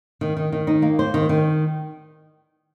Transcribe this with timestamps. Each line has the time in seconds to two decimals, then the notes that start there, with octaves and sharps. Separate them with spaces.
0.21 D#3
0.37 D#3
0.52 D#3
0.67 D#4
0.82 A#3
0.99 C5
1.14 D#3
1.29 D#3